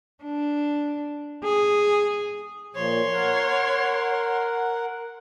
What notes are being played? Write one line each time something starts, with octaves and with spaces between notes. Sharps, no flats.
D4
G#4
A#2 F3 C#5 C6
A#4 F#5